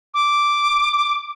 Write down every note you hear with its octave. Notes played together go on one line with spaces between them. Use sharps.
D6